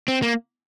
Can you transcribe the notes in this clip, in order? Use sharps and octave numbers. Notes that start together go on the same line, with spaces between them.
C4
A#3